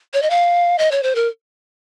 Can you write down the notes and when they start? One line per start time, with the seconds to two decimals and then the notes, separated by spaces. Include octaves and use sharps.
0.14 C#5
0.22 D#5
0.30 F5
0.78 D#5
0.91 C#5
1.03 C5
1.15 A#4